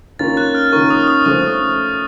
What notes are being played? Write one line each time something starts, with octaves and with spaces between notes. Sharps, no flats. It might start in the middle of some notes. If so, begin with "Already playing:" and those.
D#3 A#3 C#4 F4 A#4 A6
F#6
F6
D#3 A#3 C#4 F4 A#4 C#6
D#6
D#6
F3 A3 C#4 A4 C5 C#6